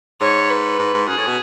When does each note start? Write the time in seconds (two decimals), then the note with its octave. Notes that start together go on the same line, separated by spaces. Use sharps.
0.21 G#2 C#5
0.50 B4
0.79 G#2
0.94 G#2
1.08 F#2 G#4
1.18 A2
1.27 B2